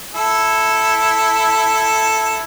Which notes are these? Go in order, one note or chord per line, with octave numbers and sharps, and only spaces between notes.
E4 A4